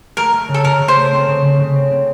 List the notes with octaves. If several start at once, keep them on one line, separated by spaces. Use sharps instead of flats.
A3 A#4
A3
C#3
A4
C#3 A#4
C#3
C5
A3
C4
C#3
C#3
C#3
C4
C4